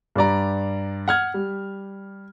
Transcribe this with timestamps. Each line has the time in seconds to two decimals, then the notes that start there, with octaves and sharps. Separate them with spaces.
0.16 G2 G3 D5 A#5
1.08 F#5 F6 G#6
1.34 G3